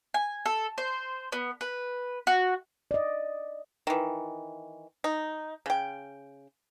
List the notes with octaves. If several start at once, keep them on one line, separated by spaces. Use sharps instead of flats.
G#5
A4
C5
B3
B4
F#4
D5 D#5
D#3 E3
D#4
C#3 G5